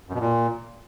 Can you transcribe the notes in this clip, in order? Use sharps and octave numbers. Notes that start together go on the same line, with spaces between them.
F#2
B2
A#2